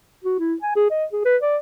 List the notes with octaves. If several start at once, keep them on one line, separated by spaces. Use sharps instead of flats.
F#4
E4
G#5
G#4
D#5
G#4
B4
D5